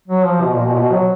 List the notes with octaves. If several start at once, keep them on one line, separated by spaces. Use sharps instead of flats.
F#3
F3
B2
A#2
B2
A#2
B2
F#3